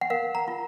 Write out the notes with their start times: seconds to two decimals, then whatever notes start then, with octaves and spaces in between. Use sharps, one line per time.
0.01 F#5
0.10 A#4 F5
0.35 A#5
0.48 F4